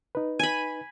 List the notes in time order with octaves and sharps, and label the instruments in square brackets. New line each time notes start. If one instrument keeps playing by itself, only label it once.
[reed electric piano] D#4 B4
[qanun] G#5 B5